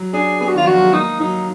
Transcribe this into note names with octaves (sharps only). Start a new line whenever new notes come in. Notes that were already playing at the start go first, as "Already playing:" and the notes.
Already playing: F#3
D4 G#4
B3 G#4
F#4
D#3 F4
F3 F#4
F#3
G#3
A#3 D#4
F#3 D#4